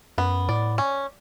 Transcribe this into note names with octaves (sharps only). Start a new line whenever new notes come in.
F#2 B3
A2 D5
C#4